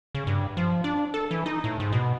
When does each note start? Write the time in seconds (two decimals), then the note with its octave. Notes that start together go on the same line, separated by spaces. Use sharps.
0.15 C#3
0.27 G2
0.57 F3
0.84 D4
1.14 A4
1.31 E3
1.46 D#4
1.64 A2
1.80 G#2
1.93 B2